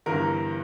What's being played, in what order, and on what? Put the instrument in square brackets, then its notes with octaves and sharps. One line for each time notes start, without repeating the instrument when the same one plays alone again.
[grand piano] G1 G2 E3 A#4